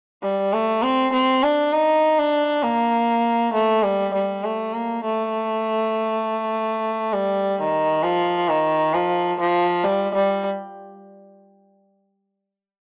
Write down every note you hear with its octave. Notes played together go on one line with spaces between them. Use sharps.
G3
A3
C4
C4
D4
D#4
D4
A#3
A3
G3
G3
A3
A#3
A3
G3
D#3
F3
D#3
F3
F3
G3
G3